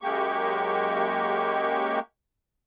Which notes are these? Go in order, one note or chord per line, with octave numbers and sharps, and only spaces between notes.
F#2 G#3 A#3 G4 C#6